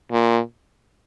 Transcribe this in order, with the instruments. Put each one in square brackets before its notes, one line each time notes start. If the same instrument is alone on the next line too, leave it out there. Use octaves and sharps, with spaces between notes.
[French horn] A#2